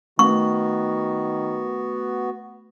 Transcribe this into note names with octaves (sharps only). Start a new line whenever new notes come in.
D#3 A3 B3 F#4 C#6